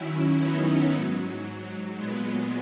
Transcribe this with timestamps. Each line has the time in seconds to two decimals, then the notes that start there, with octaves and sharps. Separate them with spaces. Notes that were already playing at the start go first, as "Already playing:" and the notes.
Already playing: F#2 D#3 F#3 C#4 E4
0.41 B3 D#4
0.93 G#2 F#3
1.96 A#2 F#3 G#3 B3